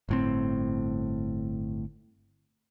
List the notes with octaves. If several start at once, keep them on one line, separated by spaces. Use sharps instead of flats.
G1 A2 C4